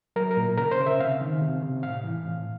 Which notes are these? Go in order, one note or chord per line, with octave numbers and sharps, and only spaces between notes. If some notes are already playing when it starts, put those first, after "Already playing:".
F#3 A#4
A#4
A#2
C#3 A#4
C5
C#3
E5
C3 F5
D#3
C3
C3
A2 F5
E3
A2